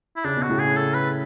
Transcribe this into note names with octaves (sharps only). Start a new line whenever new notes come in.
E4
C#3 D4
B2
F#4
A2 C#3
G#4
A4
B4